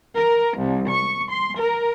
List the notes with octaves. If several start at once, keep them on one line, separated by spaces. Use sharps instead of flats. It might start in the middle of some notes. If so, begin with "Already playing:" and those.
A#4
C2
C#6
C6
A#4